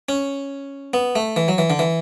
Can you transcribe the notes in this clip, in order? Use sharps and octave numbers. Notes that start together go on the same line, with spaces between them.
C#4
B3
A3
E3
F#3
E3
D3
E3